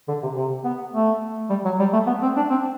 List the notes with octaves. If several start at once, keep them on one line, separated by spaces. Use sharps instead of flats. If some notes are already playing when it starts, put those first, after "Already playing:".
D3
C3
C3
B3
A3
G3
F#3
G3
A3
B3
C4
D4
C4